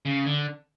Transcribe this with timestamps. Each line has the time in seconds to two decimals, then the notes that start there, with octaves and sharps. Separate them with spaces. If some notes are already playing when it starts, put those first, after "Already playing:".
0.05 C#3
0.26 D3